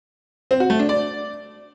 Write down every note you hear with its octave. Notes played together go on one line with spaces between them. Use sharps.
C4
F#4
A3
D4
D5